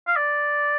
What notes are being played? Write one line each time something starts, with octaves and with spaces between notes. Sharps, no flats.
F5
D5